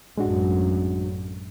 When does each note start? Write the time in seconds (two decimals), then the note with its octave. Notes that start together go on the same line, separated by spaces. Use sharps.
0.17 A1 F#2 G#3 D4 F#4